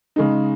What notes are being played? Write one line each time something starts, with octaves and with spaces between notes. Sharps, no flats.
C#3 G#3 D#4